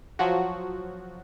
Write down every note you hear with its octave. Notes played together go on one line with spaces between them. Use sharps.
F3 F#3 F#4